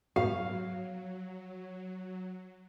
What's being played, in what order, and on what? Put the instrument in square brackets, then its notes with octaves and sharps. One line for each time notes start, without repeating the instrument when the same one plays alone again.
[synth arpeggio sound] G#2 B3 [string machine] F#3 [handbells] F#4 [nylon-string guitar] F5